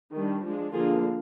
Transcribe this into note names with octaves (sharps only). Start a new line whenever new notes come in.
D#3 G3 D4
F3 G#3 D4
D3 F3 A#3 D4 F4 G#4